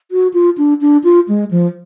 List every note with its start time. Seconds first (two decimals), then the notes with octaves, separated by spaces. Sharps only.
0.11 F#4
0.34 F4
0.58 D4
0.81 D4
1.04 F4
1.28 G#3
1.51 F3